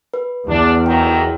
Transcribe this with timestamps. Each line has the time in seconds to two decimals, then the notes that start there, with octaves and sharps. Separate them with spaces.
0.14 B4
0.48 E2 D4
0.86 F2 D#3 F#3 G5